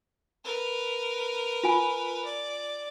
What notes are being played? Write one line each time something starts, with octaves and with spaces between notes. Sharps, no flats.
A#4 B4
F4 G#5
D5